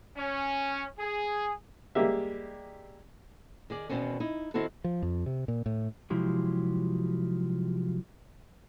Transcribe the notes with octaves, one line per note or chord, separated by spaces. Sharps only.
C#4
G#4
G3 G#3 A#3 G4 E5
D#3 G#4 D5
E2 G2 B2 D#3 C4 C#4
D#4 E4
D#3 C4 E4 F#4 A4
F3
F2
C3
A#2
A2
C3 F3 F#3 G#3 E4 G4